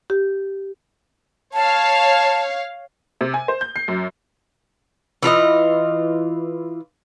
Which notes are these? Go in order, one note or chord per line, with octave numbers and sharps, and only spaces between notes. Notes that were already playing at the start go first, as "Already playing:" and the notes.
G4
C#5 F5 A5
C3
G#5
C5
G6
C7
F#2
E3 F4 A#4 D#5